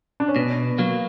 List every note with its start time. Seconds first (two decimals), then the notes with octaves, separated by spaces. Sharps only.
0.20 D4
0.28 C#4
0.36 B2 B3
0.78 F#3 A#3